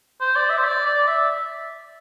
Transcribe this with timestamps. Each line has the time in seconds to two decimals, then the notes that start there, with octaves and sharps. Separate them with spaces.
0.21 C5
0.36 D5
0.50 E5
0.58 C5
0.65 D5
0.86 D5
1.07 E5